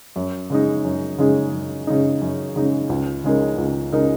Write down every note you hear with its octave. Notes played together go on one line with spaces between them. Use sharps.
F#2
C#3 G#3 D#4
F#2
C#3 G#3 D#4
F#2
C#3 G#3 D#4
F#2
C#3 G#3 D#4
C#2
C#3 G#3 D#4 A#4
C#2
C#3 G#3 D#4 A#4